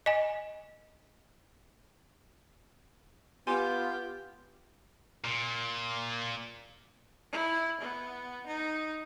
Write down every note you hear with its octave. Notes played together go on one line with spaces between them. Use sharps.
D#5 G#5
B3 F4 G4 G#5 C6
A#2
E4
B3
D#4